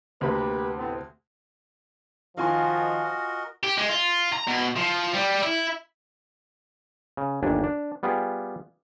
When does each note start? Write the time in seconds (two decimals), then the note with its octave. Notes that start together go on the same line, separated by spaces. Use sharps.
0.21 D2 C3 A#3 G4 B4 B5
0.77 A2 B3 C4
2.37 D#3 F3 F4 F#4 A#4 D#5 G#5 C6
3.63 G4
3.77 G#3
3.89 F4
4.33 A#5
4.48 B2
4.77 F3
5.15 G3
5.43 E4
7.17 C#3
7.43 G1 D#2 D4 G4 G#5
7.64 D4
8.03 G3 B3 F4 G4 G#4